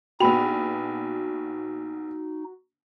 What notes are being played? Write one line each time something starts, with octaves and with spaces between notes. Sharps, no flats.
A#1 B3 D#4 F#4 G5 B5 F7